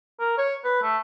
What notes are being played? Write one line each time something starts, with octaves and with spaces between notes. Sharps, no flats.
A#4
C#5
B4
A3